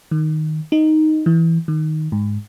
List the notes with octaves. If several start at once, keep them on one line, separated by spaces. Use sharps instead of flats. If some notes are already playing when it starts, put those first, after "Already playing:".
D#3
D#4
E3
D#3
G#2